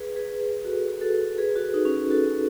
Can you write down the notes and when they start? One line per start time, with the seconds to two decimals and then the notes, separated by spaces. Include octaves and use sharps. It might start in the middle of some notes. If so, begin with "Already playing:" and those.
Already playing: G#4 B4
0.16 G#4 B4
0.40 G#4 B4
0.65 F#4 A4
1.01 F#4 A4
1.38 G#4 B4
1.56 F#4 A4
1.74 D#4 F#4
1.85 C#4
1.93 D#4
2.11 F#4 A4